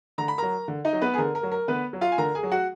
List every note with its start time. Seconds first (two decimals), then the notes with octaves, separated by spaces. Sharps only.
0.18 D3 A#5
0.28 B5
0.38 F#3 A#4 A#5
0.68 D3
0.85 D#4 D#5
0.93 F#3
1.02 B3 B4
1.14 G#4
1.18 D3 A#4
1.35 A#4
1.43 F#3
1.52 A#4
1.68 D3 B3 B4
1.93 F#3
2.01 F4 F5
2.12 G#5
2.18 D3 A#4 A#5
2.35 G#4 G#5
2.43 F#3
2.52 F#4 F#5